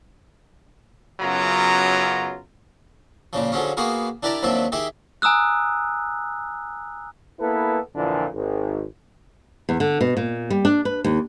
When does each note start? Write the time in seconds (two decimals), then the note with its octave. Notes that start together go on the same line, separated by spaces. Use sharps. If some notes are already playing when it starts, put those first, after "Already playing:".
1.20 F#2 C#3 F#3 B3 F4 A#5
3.33 A#2 C#3 F3
3.52 D3 F3 F#3 G#3 C#4
3.77 A#3 B3 F#4 G#4 A#4
4.23 D4 E4 G4 A#4 D5 A#5
4.43 D#2 C3 F3 F#3 D4 E5
4.72 D#3 G4 G#4 E5
5.22 G#5 A#5 D#6 E6 F#6
7.40 A#3 B3 E4 A4 B4
7.95 F2 A#2 D3 E3 F3
8.33 G#1
9.69 E2
9.80 D3
10.01 B2
10.17 A#2
10.50 G3
10.65 D4
10.85 B4
11.04 D#2